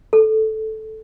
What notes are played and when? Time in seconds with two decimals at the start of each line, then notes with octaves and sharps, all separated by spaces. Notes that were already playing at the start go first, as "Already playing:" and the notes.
0.13 A4